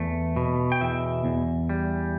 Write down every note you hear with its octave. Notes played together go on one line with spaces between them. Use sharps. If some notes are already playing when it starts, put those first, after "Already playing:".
Already playing: E2 A3
B2
G5
E2 E5
E2
G3